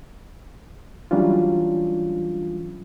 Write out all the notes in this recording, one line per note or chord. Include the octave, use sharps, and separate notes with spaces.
E3 F#3 G3 C#4 D4 F4